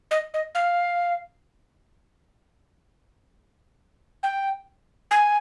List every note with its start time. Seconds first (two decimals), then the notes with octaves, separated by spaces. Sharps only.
0.11 D#5
0.34 D#5
0.55 F5
4.23 G5
5.11 G#5